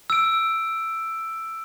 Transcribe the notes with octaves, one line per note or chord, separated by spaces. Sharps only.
E6 D7